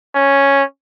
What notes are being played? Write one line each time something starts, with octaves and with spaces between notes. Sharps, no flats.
C#4